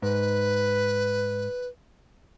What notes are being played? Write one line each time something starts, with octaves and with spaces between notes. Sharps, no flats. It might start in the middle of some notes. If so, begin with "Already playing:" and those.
G#2 B4